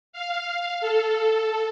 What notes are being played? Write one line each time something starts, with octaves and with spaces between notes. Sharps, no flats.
F5
A4